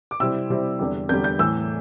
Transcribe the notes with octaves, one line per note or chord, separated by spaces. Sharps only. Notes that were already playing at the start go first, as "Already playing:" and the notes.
D6
C3 G3 C4 E4 E6
C3 G3 C4 E4
E2 D3 G3
E2 D3 G3 G6
G6
A2 E3 A3 E6